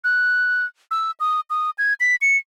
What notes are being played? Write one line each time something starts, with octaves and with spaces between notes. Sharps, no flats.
F#6
E6
D#6
D#6
G#6
B6
C#7